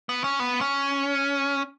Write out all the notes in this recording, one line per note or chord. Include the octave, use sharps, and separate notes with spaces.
B3
C#4
B3
C#4